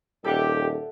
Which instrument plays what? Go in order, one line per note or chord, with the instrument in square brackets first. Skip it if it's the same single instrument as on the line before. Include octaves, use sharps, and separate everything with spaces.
[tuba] D#1 [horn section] G4 [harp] A4 E5 F#5